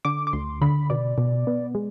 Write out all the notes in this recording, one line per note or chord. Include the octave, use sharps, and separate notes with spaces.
D3 D6
D6
D2 C6
D3 B5
B2 D5
B2
B3
G#3